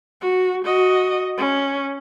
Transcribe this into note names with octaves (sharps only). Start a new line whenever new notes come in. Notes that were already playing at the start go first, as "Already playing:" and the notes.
F#4
F#4 D#5
C#4